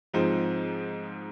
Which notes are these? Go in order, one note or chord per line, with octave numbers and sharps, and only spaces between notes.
G#2 F3 C4 D#4